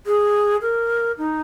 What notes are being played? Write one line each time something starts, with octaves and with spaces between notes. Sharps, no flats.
G#4
A#4
D#4